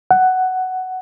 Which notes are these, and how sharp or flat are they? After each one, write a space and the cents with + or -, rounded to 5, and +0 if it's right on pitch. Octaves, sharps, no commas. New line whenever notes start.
F#5 +10